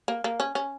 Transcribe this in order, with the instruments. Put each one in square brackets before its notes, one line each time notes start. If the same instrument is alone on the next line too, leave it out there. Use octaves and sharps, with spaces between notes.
[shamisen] A#3
A#3
C#4
C#4